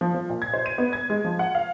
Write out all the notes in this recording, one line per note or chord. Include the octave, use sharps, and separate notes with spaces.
F3
F3
A#2
G#6
C5
D#7
B3
G#6
G#3
F3
F#5
F5